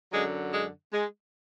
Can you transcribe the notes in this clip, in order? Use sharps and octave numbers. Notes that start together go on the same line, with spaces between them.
F#2 D3 F#3 G#3
G#3
G#3